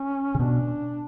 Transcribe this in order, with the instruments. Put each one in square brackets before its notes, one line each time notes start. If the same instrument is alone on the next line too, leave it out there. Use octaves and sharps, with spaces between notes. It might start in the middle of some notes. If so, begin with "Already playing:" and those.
Already playing: [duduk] C#4
[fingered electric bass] C#3
[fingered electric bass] B2 [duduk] D4